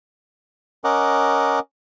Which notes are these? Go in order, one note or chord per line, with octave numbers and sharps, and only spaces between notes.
C#4 A#4 D#5 F#5 D6